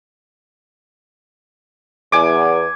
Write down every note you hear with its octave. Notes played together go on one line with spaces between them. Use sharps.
E2 G#5 D6